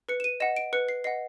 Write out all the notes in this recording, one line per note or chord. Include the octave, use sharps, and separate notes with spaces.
B4 C#7
E7
D#7
D#5 F#5 E7
D7
B4 C#7
C7
D#5 F#5 C7